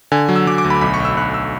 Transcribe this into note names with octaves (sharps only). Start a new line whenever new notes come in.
D3 G#5
F#3
E6
F#3 D6
D6
D2
B5
B1 B5
C#6
B1 E6
B1 F#6
E6